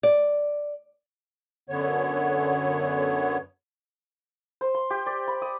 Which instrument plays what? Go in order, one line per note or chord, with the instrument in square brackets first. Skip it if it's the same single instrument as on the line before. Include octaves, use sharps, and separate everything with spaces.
[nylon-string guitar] D5
[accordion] F#2 D3 B3 C#5
[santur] C5
C6
G4
D5
B5
D#6